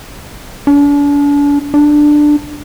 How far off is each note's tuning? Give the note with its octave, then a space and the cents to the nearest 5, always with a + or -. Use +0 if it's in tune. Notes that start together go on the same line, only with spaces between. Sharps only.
D4 -40
D4 +10